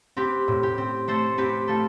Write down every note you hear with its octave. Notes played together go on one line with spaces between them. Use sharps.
C4 G4 B4
A2
G4
C4
A3 A4 C5
C4 G4 B4
A3 F4 A4